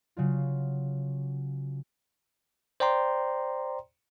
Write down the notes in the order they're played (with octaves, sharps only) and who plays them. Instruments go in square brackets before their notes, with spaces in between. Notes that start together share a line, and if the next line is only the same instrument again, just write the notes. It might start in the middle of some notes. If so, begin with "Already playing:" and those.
[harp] C#3 F#3 F4
[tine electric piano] C5 D5 G5 A#5 C6